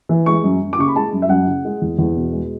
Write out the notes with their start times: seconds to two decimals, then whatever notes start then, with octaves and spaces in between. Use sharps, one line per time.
0.09 E3
0.26 G#3 C#6
0.44 F#2
0.61 F#2
0.73 D6
0.78 C#3 C#6
0.88 B5
0.96 G#3 A5
1.13 F#2
1.22 E5
1.29 F#2 F#5
1.47 C#3
1.65 G#3
1.82 E2
1.98 E2
2.16 B2
2.33 G#3